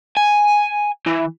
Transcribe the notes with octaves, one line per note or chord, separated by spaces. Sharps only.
G#5
E3